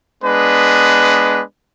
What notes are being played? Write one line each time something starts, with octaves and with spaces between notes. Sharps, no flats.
G#3 B3 D4 B4